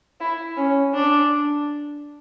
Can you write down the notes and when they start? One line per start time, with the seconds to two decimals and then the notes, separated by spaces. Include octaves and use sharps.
0.20 E4
0.57 C#4
0.94 D4